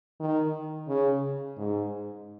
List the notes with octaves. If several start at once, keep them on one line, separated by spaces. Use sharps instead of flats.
D#3
C#3
G#2